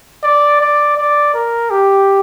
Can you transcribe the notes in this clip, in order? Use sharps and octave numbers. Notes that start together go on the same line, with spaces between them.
D5
D5
D5
A#4
G4